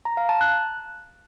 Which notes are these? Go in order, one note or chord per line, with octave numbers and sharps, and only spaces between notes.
A#5
F5
A5
F#6